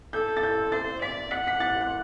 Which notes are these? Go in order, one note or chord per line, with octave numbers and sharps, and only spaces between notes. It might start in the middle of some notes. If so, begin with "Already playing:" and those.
A4 G6
A6
G6
C5 A6
D5 B6
F#5 B6
B6
A6
F#6